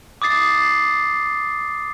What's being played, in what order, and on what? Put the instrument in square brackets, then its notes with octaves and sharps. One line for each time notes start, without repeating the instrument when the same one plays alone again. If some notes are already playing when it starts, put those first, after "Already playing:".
[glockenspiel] D6 D#6 A6 C7